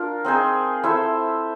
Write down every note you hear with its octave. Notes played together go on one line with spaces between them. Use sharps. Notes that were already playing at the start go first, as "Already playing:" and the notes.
Already playing: D4 F4 A#4
C4 D#4 G#4 C5
E4 A4 C5 E5